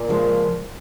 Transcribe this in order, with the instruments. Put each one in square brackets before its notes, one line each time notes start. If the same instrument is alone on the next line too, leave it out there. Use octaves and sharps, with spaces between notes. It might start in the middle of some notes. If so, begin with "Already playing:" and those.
Already playing: [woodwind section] A#2
[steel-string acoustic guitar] C#3 F3 G#3